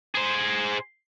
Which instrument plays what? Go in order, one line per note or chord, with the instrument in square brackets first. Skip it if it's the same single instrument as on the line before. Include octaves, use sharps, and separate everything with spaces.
[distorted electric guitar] G#4 C5